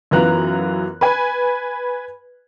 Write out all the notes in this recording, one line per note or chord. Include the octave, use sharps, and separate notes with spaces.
F#2 E3 B3 F4 A#5 F#6
B4 G#5 B5